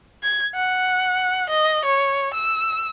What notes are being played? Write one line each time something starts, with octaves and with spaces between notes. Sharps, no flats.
G#6
F#5
D#5
C#5
E6